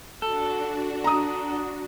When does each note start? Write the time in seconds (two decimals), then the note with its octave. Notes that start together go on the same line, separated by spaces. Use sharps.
0.22 D4 F#4 A4
1.04 A#5 D#6